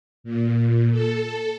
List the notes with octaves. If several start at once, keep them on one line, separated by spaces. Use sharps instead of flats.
A#2
A4